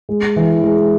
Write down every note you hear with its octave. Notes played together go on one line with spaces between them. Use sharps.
G#3
E3
G#3